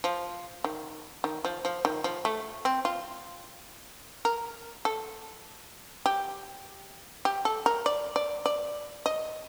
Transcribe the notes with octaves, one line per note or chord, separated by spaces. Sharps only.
F3
D#3
D#3
F3
F3
D#3
F3
A3
C4
F4
A#4
A4
G4
G4
A4
A#4
D5
D5
D5
D#5